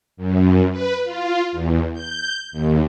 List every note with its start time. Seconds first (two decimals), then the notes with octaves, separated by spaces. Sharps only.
0.17 F#2
0.71 B4
1.04 F4
1.52 E2
1.93 G6
2.52 D#2